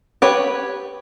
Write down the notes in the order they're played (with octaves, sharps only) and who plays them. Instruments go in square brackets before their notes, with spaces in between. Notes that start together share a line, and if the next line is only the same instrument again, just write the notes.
[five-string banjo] G4 B4 C#5